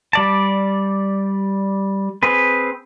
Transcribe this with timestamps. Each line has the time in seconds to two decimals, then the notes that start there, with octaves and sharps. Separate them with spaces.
0.13 G3 D5 A5
2.23 C4 G#4 B4